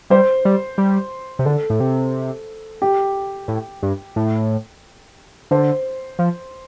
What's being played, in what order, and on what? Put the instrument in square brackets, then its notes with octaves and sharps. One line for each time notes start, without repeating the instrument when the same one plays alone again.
[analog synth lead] G3 [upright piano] C5
[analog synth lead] G3
G3
C3
[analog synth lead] D3 [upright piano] A4
[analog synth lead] A2
C3
[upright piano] G4
[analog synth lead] A2
G2
A2
[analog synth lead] D3 [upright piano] C5
[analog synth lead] F3